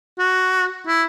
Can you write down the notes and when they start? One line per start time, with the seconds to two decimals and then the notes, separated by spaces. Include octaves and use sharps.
0.19 F#4
0.87 E4